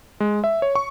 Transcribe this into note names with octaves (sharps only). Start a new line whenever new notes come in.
G#3
E5
C#5
C#6